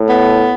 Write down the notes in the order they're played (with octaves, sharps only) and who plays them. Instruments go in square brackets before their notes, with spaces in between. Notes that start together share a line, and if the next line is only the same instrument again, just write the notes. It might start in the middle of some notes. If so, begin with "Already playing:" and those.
Already playing: [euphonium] A2
[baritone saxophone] B3